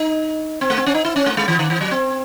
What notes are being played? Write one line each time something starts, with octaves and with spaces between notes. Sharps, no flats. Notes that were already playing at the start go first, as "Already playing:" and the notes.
Already playing: D#4
C4
A3
C4
C#4
D#4
E4
C#4
A3
G#3
E3
D#3
E3
F#3
C4